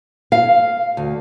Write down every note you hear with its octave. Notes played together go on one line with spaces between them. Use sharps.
F5
D2